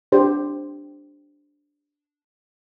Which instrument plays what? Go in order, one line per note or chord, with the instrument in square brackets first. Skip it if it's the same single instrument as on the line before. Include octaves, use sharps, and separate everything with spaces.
[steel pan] D4 G4 C5